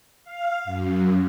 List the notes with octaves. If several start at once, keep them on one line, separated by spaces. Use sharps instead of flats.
F5
F#2